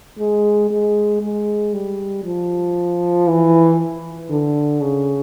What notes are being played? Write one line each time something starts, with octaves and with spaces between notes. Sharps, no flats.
G#3
G#3
G#3
G3
F3
E3
D3
C#3